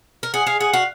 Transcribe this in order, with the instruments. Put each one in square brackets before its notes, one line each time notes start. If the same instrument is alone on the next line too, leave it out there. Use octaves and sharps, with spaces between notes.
[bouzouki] A#4
[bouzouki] G#4 [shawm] F#5
[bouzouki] G#4 [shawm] F5
[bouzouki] G#4 [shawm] F#5
[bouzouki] F#4 [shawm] F5